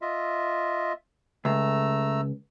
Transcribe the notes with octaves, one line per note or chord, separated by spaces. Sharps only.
F4 D#5 E5
C#2 A3 A#5 E6